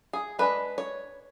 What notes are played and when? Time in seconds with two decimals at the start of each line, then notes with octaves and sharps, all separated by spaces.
0.13 G#4
0.39 G#3 D4 B4
0.78 C#5